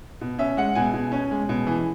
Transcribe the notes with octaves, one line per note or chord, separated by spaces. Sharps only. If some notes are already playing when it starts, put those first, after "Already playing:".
B2
C#4 E5
G#3 F#5
B2 G#5
B2
C#4
G#3
B2
E3